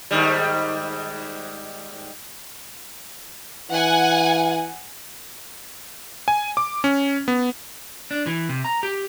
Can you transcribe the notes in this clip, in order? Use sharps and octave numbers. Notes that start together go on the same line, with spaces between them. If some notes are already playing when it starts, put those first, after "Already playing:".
G#2 D#3 G3
E3 F#5 G#5
G#5
D6
C#4
B3
D4
E3
C3
A#5
G4